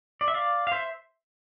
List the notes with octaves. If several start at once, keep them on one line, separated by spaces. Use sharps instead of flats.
D5
E5
D5 F5
F5
C5 E5